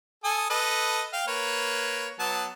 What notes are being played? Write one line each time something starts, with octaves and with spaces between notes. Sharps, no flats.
A4 G#5 D#6
A4 B4 D#5
F5 G5
A#3 B4 C#5
F#3 B3 A5